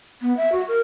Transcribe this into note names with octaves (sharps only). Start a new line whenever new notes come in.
B3
E5
F#4
A#4